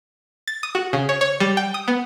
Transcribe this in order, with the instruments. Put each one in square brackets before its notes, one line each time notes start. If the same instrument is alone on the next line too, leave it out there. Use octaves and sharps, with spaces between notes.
[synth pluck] A6
D#6
F#4
C#3
C#5
C#5
G3
G5
D#6
B3